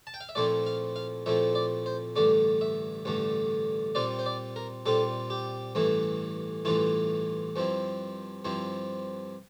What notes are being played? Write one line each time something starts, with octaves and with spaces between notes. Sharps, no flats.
A5
G5
F5
E5
A#2 F3 A3 C4 E4 D5
F5
F5
A#2 F3 A3 C4 E4 E5
D5
C5
A1 G2 D3 A3 D5
E5
A1 G2 D3 A3
A#2 G3 C4 F4 D5
C5
D5
A#4
A#2 G3 C4 F4 A4
G4
A1 G2 E3 A3 E4
A1 G2 E3 A3 E4 F4
G2 F3 C4 E4
G2 F3 C4 E4